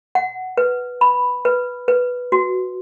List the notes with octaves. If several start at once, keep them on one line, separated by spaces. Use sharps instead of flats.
F#5
B4
B5
B4
B4
F#4